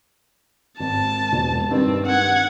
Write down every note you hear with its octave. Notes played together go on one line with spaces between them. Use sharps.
G#1 A5
E1
G2 D#3 G3 C4
F#5 G#6